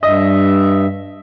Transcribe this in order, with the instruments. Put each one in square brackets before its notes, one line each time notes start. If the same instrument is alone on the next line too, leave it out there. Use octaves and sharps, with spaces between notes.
[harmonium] G2 E5 [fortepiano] D#5